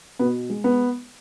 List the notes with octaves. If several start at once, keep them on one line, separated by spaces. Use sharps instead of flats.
B2 B3
G#3
B3